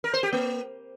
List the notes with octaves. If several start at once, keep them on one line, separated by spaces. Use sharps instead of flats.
A#4
C5
G4
A#3